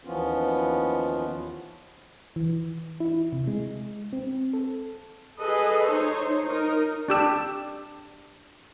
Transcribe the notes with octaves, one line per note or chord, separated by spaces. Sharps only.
D#2 E3 F3 B3 C#4 F4
E3
E4
C3
G#3
C4
A4
G#4 A4 B4 D#5
D#4 C5 C#5
D#4 A#4
D4 G4 E6